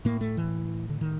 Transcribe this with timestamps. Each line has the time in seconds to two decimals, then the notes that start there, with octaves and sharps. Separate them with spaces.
0.05 A2 A#3
0.21 A3
0.37 E3
0.90 D3
1.01 D#3